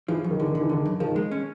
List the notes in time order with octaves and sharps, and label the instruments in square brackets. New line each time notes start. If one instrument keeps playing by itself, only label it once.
[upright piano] E3 [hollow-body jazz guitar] F3
[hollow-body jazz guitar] F#2
[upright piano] D#3
[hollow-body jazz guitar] D3 [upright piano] E3
[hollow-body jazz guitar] D3 [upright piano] D#3
[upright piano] E3
[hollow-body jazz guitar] D3 [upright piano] D#3
[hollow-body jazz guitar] F#2
[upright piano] D#3 [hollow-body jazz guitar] F3
[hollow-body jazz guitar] G#3
C#4